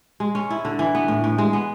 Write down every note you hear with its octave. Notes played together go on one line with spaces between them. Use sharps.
G#3
C#4
E4
D3
E3
B3
A2
A2
G#3
B3